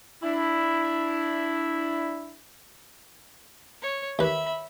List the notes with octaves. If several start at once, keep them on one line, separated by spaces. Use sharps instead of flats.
D4 E4
C#5
D#2 B4 E5 B5